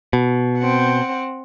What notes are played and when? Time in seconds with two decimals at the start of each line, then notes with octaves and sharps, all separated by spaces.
0.13 B2
0.59 C4 F#5